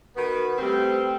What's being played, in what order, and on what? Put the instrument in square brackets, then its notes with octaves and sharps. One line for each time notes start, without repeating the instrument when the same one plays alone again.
[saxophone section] D#3 B3 [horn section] F#4 B4
[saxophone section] G3 C4 [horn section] A3 G4